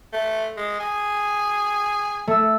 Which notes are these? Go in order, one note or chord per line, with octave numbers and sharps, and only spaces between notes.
A3
G#3
G#4
A3 E6